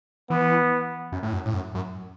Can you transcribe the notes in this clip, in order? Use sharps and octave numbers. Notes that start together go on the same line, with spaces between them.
E3 B3
F#2
A2
F#2
A2
F#2
F#2